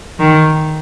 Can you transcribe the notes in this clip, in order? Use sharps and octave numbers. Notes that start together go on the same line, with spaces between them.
D#3